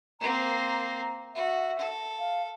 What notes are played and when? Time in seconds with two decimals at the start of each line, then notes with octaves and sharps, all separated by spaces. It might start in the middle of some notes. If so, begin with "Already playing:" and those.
0.21 A#3 C4 A#5
1.35 F#4 E5
1.78 A4
2.19 F5